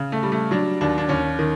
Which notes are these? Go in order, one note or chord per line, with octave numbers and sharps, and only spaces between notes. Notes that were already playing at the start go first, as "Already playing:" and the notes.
Already playing: C#3
A3
G3
A3
F#3 D4
D#2 D4
D4
D#2 C#4
D#3